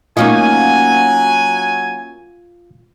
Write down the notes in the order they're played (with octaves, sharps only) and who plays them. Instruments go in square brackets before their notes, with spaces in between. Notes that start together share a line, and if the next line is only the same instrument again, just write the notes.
[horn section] F#3 G#5 [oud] A#3 C#4 D#4 [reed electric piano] F4 F5